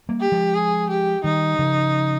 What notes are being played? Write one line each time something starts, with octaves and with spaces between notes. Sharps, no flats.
G3 A#3
G4
F3 G#3
G#4
G4
D#3 G3 D#4
C#3 F3